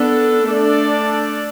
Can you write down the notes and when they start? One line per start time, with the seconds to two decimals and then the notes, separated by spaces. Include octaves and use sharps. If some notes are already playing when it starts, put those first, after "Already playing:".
Already playing: B3 D4 A4
0.47 A3 D4 A4 D5